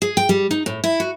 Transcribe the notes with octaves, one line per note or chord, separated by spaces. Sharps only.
G#4
G5
G3
D#4
A2
E4
F#4